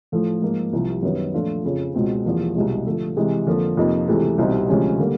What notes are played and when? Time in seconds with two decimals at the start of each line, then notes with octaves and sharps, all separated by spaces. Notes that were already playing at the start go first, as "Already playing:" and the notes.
0.12 A2 F3 A3
0.42 G#2 F3 A#3
0.73 C2 C3 F3
1.02 F#2 D#3 G3 B3
1.34 A#2 F3 A3 D4 F4
1.65 F2 C#3 F3
1.94 C#2 B2 G#3 C4
2.25 E2 C3 F3 A#3
2.55 C2 B2 G#3
2.86 D3 F3 A3
3.17 C3 E3 G#3
3.47 F2 D3 F3 A#3
3.77 F2 C3 F3 A#3 D#4
4.08 C#2 C3 E3 A3
4.38 C2 B2 G3 C4 D#4
4.68 D2 C3 F3 G#3 C#4
4.99 D3 G3 A#3